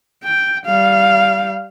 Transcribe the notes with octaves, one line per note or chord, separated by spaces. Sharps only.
G5
G3 F5